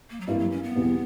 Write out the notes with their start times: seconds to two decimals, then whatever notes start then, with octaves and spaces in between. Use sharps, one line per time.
0.10 A#3
0.21 F#3
0.27 G2 E3 G3 A#3 E4
0.39 F#3
0.51 C#4
0.64 B3
0.76 E2 B2 G3